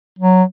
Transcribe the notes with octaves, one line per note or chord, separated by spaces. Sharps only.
F#3